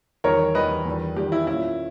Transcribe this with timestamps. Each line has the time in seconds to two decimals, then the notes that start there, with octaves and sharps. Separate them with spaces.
0.24 E2 D#3 G3 A#4 C#5
0.55 E2 D#3 G3 B4 D#5
0.85 E2 D#3 G3
1.16 E2 D#3 G3 G4
1.32 E4
1.47 A#2 A#3 C#4 E4